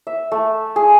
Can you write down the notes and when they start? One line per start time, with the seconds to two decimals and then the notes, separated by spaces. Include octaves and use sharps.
0.07 E5
0.32 A3
0.76 G#4